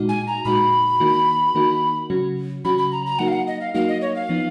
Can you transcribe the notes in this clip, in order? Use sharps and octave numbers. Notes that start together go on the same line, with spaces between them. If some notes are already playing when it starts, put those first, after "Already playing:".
Already playing: A#2 G#3 D#4 F#4
G#5
A#5
A#2 G#3 D#4 F#4 B5
D#3 A#3 D#4 F#4
D#3 A#3 D#4 F#4
C#3 F#3 C#4 F#4
C#3 F#3 C#4 F#4 B5
B5
A#5
A#5
F#3 A#3 D#4 F#4 F#5
F5
F#5
D#5
F5
F#3 A#3 D#4 F#4 F5
D#5
C#5
F5
F3 B3 D#4